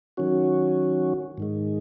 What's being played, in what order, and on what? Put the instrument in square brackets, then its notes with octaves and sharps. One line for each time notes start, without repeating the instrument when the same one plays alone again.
[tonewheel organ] D#3 F#3 C#4 F#4
G#2 D#3 G#3